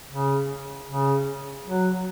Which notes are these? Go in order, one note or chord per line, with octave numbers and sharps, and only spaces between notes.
C#3
C#3
F#3